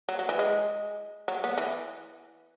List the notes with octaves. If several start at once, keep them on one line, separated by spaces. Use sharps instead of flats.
F#3
F#3
E3
G#3
F#3
B3
E3